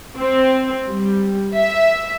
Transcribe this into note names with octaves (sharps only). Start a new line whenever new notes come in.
C4
G3
E5